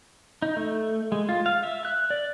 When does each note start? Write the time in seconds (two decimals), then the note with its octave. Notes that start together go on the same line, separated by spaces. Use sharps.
0.42 D#4
0.57 A3
1.12 G#3
1.29 F4
1.46 F5
1.63 E5
1.85 F#6
2.10 D5